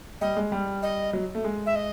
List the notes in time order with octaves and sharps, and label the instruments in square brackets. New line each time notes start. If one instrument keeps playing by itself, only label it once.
[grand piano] G3 [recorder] D#5
[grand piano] G#3
G3
[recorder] D#5
[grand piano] F#3
A3
G#3
[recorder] E5
D#5